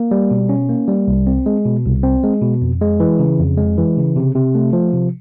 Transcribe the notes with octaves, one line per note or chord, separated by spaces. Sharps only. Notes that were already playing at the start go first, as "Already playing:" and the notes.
Already playing: A#3
G3
B2
C#4
A#3
G3
C2
C4
G#3
B2
C2
C4
G#3
B2
F2
G#3
E3
C#3
F2
G#3
E3
C#3
C3
C3
A3
F3
C3